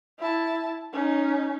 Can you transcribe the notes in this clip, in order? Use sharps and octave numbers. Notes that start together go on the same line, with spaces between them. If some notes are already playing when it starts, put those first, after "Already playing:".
E4 A5
C#4 D#4